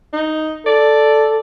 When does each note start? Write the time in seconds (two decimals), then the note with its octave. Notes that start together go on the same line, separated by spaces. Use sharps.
0.13 D#4
0.66 A4 D5